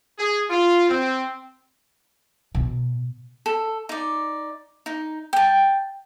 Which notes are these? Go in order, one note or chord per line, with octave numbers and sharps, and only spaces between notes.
G#4
F4
C4
B2
A4
D#4 D5
D#4
G5 A5